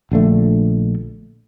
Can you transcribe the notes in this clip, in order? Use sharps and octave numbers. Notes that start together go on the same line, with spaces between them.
A#1 D3 A3